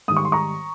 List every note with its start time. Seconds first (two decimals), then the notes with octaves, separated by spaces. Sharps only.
0.08 G#2 D#3 G3 D#6
0.17 C#6
0.25 C6
0.32 A#5 C#6